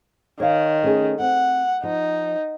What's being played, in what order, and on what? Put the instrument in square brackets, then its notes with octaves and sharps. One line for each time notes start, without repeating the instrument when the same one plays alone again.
[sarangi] D#3 [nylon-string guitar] C#5 F5
[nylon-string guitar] A3 C#4 G#4
[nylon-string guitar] C4 [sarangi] F#5
[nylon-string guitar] F3 [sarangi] D#4